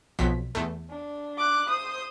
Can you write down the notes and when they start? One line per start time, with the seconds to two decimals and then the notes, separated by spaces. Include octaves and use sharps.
0.19 B1 F2 B6
0.55 E2 A3
0.90 D4
1.38 D6 F#6
1.69 C5 D#6